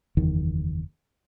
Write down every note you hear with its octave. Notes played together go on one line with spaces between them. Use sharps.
F#1 E2 D#3